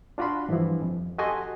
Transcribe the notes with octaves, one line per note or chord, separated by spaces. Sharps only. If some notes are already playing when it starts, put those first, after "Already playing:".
D4 F4 F#4 D5 B5 C6
G2 E3 F3 E4
F2
F#4 G4 A4 D#5 G#5 C6